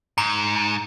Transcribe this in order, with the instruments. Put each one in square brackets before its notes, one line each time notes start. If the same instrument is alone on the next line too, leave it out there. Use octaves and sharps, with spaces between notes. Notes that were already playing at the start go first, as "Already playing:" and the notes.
[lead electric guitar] G#2 [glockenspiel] A#5